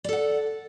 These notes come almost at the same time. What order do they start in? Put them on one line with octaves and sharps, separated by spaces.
D5 A4 F#5